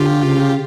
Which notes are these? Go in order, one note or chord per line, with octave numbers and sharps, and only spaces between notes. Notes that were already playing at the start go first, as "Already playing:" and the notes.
Already playing: D3 F4 G4
C#3